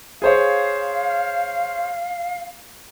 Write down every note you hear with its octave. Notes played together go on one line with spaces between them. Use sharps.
G#4 C5 C#5 F5